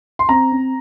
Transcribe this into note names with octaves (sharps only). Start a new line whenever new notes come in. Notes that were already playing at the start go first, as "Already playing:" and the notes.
C6
C4 A#5
C4